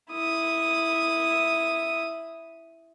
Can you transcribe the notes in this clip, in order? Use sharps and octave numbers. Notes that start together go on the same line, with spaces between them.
E4 D#6